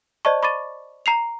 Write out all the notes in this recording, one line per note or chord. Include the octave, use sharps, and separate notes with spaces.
C5 D5 D#5 A5 C#6
B5 C#6 D6 A6 D#7
A#5 C7 F7